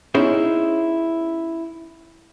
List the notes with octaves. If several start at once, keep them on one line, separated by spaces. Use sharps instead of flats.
B3 C#4 D#4 E4 G#4 C5